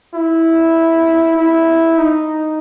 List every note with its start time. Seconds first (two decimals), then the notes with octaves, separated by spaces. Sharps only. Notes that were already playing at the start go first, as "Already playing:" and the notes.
0.14 E4
1.37 E4
1.98 D#4